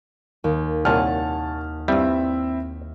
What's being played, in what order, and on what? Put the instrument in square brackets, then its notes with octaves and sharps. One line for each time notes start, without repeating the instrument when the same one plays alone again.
[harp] D#2
[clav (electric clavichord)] C2 A#2 [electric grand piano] C#5 A5 F6 [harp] F#5 G#5
[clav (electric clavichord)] G2 G3 [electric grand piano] C4 E4 E5